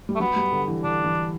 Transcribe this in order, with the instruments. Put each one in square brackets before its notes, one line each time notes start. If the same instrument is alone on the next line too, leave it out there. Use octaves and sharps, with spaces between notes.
[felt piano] G3
[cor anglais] A3
[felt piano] F#3 [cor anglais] B3
[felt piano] G3
D3
E3
[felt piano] D3 [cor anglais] D4
[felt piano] E3